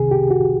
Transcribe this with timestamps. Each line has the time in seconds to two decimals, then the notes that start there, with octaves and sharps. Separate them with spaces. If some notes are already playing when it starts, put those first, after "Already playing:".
Already playing: C2 C3 D#3 G#4
0.11 G4
0.31 F#4